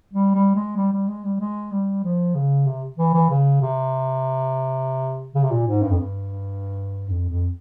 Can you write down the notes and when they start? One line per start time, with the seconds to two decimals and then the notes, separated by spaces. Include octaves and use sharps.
0.13 G3
0.35 G3
0.55 G#3
0.76 G3
0.93 G3
1.08 G#3
1.25 G3
1.40 G#3
1.72 G3
2.04 F3
2.35 C#3
2.67 C3
2.98 E3
3.14 E3
3.30 C#3
3.62 C3
5.35 C#3
5.44 C3
5.51 A#2
5.67 G#2
5.82 G2
5.90 F2
5.99 G2
7.09 F2
7.30 F2